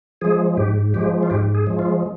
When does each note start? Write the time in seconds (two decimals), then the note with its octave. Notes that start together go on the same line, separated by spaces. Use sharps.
0.21 F3 G#3 G#4
0.57 G#2 G4
0.94 F3 G#3 G4
1.23 F4
1.30 G#2 G4
1.55 G#4
1.67 F3 G#3
1.79 F4